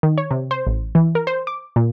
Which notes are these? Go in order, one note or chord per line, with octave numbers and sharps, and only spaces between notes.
D#3
C#5
C3
C5
A1
E3
A#4
C5
D6
A#2